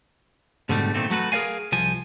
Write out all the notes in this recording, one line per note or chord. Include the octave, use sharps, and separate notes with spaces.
G#2 B2 D3 G3 A3
A#2 D#3 A3 C4
F#3 A3 F#4 B4
G#4 A#4 B4 D5 F5 G#5
C2 F3 G#5